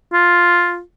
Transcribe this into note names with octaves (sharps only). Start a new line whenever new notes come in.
F4